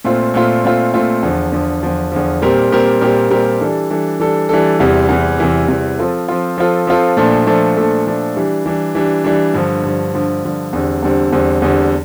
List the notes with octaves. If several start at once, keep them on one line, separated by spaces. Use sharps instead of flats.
A#2 A3 C4 F4
A#2 A3 C4 F4
A#2 A3 C4 F4
A#2 A3 C4 F4
E2 D3 F3
E2 D3 F3
E2 D3 F3
E2 D3 F3
A#2 G3 C4 G4 A#4
A#2 G3 C4 G4 A#4
A#2 G3 C4 G4 A#4
A#2 G3 C4 G4 A#4
E3 G3 D4 A4
E3 G3 D4 A4
E3 G3 D4 A4
E3 G3 D4 A4
E2 C3 E3 G3
E2 C3 E3 G3
E2 C3 E3 G3
E2 C3 E3 G3
F3 C4 F4 A4
F3 C4 F4 A4
F3 C4 F4 A4
F3 C4 F4 A4
A#2 F3 A3 D4 A4
A#2 F3 A3 D4 A4
A#2 F3 A3 D4 A4
A#2 F3 A3 D4 A4
E3 G3 D4
E3 G3 D4
E3 G3 D4
E3 G3 D4
G2 D3 F3
G2 D3 F3
G2 D3 F3
G2 D3 F3
E2 D3 G3 C4
E2 D3 G3 C4
E2 D3 G3 C4
E2 D3 G3 C4